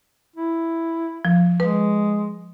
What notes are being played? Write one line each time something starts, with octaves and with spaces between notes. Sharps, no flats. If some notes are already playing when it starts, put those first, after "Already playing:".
E4
F3
G#3 B4